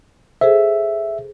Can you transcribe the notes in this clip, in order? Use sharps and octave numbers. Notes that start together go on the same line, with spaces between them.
G#4 A4 C5 E5